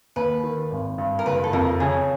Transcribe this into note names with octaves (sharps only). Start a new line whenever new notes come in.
D#2 B4
D#3
G#1
G2
A#4
F#1 B4
A4
F2 A#4
C#3 G#4